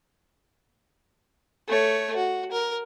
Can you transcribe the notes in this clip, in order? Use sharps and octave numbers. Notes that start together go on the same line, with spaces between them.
A3 C#5
F#4
A#4